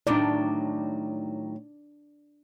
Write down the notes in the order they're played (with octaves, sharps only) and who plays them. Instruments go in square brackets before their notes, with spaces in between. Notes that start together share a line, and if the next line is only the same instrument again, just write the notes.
[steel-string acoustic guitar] A2 D#3 F#3 [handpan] D4 D5